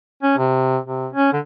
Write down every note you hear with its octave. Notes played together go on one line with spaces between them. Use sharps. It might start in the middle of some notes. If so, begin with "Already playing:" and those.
C#4
C3
C3
C#4
D3